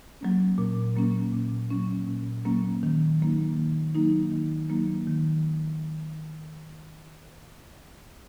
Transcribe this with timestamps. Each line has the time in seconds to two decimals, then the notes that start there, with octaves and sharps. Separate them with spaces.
0.21 F#3 A#3 C#4
0.58 A#2
0.96 F#3 A#3 C#4
1.33 A#2
1.70 F#3 A#3 C#4
2.08 A#2
2.45 F#3 A#3 C#4
2.83 D#3
3.20 F#3 A#3 D#4
3.57 D#3
3.95 F#3 A#3 D#4
4.31 D#3
4.69 F#3 A#3 D#4
5.07 D#3